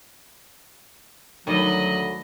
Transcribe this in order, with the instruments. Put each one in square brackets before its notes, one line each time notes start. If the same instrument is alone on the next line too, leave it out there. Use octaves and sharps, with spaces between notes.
[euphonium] D2 [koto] D#3 G3 [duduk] F#3 [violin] D#5 B5